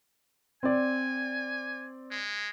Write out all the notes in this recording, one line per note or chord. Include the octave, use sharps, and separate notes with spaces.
C4 D5 G#5
G#3